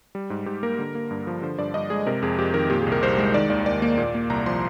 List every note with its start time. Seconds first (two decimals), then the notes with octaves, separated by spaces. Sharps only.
0.15 G3
0.30 G#2
0.46 G#2 G4
0.63 A#3 A#4
0.79 D3
0.95 A#3
1.11 G2
1.27 F3
1.42 D3 C5
1.58 G2 D5
1.74 G2 D#5
1.90 G#3 G#4
2.07 C3 A#4
2.22 F2 G#4
2.39 F2 G4
2.54 D#3 A#4
2.70 A#2 G4
2.82 G#4
2.87 C2
2.92 A#4
3.02 C2 C5
3.18 G#3
3.34 D#3 D5
3.50 D#2 D5
3.66 D#2 D5
3.82 A#3
3.98 A#2
4.15 A#3
4.30 C2 A#5
4.46 F3 C6